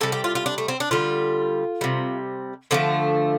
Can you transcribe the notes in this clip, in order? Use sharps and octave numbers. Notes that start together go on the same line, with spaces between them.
C3 G3 A4
G4
F4
F4
D4
A3
C4
D4
D3 G3 F4
C3 G3
D3 F3 A3 C4